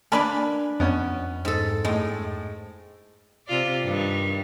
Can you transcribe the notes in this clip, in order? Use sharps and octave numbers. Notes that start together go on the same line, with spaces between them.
A#3 D4 B4 G#5 A5 B5
F2 B3 C#4
G#2 A4
A2 G#3
C3 F4 D5
G2 D#3 G3